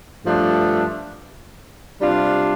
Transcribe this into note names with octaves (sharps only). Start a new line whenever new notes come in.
G2 F3 A3 D4
C3 G3 D4 F4